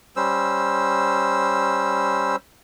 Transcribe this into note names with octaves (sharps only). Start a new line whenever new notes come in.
G3 C#4 C5 E6